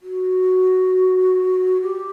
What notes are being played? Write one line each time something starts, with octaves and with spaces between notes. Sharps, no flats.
F#4
G4